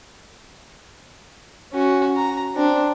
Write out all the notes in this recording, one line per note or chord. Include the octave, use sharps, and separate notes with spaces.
C#4 F#4
A#5
C4 D4